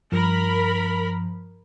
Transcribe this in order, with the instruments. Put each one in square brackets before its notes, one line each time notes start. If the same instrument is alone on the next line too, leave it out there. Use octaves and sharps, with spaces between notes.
[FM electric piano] G2 F3 [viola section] A#4 B5